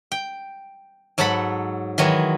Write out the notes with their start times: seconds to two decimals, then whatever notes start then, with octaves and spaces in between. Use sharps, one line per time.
0.12 G5
1.18 G#2 F#3 A4 F#5 A5 B5
1.98 D#3 E3 F#3 G#3